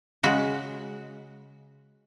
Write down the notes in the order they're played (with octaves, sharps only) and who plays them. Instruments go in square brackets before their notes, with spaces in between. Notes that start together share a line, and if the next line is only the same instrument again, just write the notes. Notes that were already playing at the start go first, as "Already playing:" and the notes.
[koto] C#3 G#3 F#4